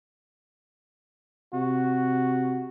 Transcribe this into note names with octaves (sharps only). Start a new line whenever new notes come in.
C3 F#4